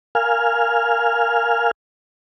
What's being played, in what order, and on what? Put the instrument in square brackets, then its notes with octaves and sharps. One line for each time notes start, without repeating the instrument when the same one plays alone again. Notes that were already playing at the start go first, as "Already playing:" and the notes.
[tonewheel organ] A#4 F5 G#5 F6